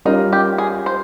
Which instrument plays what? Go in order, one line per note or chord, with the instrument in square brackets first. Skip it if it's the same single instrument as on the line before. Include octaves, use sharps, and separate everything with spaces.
[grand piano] G3 C#4 F4 A#4 [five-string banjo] D#4
[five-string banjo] G4
G#4
C5